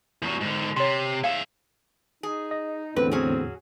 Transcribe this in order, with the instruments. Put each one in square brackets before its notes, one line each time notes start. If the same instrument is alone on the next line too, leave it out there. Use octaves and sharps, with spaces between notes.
[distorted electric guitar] E2 F#3
G#2 D3
[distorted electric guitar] C3 [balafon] C#5 C6
[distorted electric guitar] G#4 E5 [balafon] F5
[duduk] D#4 [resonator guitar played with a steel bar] G#4
[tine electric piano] D#5
[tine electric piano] E2 A2 D3 [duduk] C4 [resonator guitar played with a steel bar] B4
[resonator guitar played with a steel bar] F#3 C#4 G#4 [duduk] C4